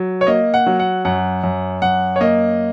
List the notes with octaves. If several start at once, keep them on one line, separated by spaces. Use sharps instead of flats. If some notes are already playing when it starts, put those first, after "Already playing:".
Already playing: F#3
C#5
A#3 D#5
F#5
F#3
F#5
F#2 F#5
F#2
F#2 F#5
C#5
A#3 D#5